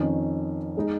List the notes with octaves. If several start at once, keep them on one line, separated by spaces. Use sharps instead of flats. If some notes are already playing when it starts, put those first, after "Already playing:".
Already playing: F2 D#3 C#4
G#3 D#4